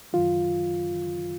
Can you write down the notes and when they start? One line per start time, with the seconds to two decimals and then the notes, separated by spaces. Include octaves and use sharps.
0.13 F#2 D#3 F#3 F4